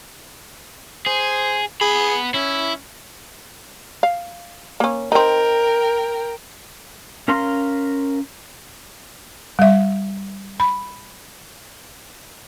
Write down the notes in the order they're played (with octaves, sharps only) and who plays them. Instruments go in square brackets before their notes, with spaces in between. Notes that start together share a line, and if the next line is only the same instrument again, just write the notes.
[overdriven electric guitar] G#4 [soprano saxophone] C5
[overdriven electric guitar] B3 B5 [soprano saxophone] G#4
[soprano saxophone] C#4 [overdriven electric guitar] E4
[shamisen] F5
A#3 C#4
[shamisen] C4 D#4 [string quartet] A#4 G5
[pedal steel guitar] C#4 A#4 F5 A#5 C6
[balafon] G3 E5
B5